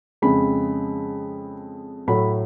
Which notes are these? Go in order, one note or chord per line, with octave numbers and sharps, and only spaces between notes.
F2 C#3 G#3 B5
A2 F#3 A3 B5